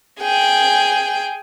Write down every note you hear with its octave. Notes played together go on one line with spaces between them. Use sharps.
G#4 G5